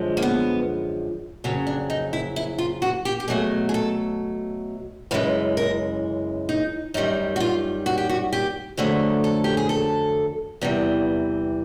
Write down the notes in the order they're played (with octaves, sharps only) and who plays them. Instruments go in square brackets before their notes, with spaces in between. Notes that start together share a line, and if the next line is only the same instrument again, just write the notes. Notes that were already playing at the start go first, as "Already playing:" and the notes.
Already playing: [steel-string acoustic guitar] F#2 D3 F3 G#3
A#3
B3
F2 C#3 F#3 C#4
D4
D#4
E4
E4
F4
F#4
G4
G4
B2 F#3 A3 G#4
G#4
A4
F#2 C#3 E3 G#3 B4
A#4
D#4
F#2 D#3 G3 D#4
F#4
F4
F#4
G4
F#4
G4
F2 D3 F#3 A3 G#4
A4
G4
G#4
A4
E2 C3 E3 G3